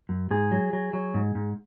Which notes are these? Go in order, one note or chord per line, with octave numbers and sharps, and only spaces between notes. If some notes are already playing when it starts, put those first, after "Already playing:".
F#2
G#2 G#4
F#3
F#3
F#3
G#2
G#2